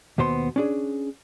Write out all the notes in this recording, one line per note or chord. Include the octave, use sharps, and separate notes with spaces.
D#2 B2 B3 C5 C6
C#4 D4 G#4